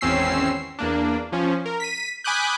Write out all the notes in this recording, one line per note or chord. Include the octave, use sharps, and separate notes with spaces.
G#1 E2 C4 C#4 E6 C7
E2 A#3 D4
F3 C#4
A#4
B6 D#7
G#5 B5 D6 D#6 F#6 G6